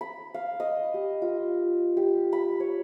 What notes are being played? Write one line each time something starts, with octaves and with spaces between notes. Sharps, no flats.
B5
F5
D#5
G4
F4
G4
B5
C#5